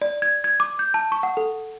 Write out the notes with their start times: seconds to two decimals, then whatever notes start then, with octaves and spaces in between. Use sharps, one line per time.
0.02 D5
0.22 G#6
0.44 G#6
0.60 D6
0.79 G6
0.94 A5
1.12 C#6
1.23 F#5
1.37 A4